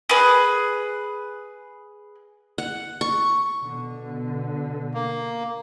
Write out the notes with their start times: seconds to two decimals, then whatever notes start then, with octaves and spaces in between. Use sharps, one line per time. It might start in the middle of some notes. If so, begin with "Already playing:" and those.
0.09 G#4 B4
2.58 F#5
3.01 C#6
3.63 B2 D3
4.94 A#3